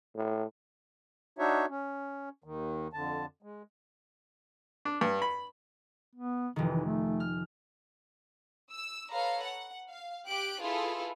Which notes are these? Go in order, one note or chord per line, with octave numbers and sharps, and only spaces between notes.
A2
D4 D#4 F#4 C#5 E5
C#4
D#2 D#3
F2 D3 A5
G#3
D4
G2
B5
B3
F1 D#3 E3
A3
F6
E6
A4 B4 C#5 F5 A#5
F#5
F5
G4 F#6 D7
E4 F4 G#4 A4 B4